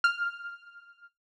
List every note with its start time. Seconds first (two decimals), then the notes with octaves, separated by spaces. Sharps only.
0.04 F6